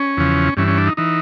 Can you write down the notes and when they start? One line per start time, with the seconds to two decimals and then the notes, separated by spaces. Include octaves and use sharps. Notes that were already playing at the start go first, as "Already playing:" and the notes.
Already playing: C#4
0.17 E2 C#3 F3
0.57 G2 E3 C#4
0.68 C#4
0.78 D4
0.87 D#4
0.97 E3 D#4